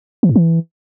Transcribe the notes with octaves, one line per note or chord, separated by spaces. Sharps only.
E3
G#2
E3